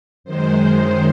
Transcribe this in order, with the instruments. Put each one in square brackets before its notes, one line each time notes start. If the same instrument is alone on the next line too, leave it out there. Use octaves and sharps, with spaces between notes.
[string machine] F#2 D#3 G#3 C5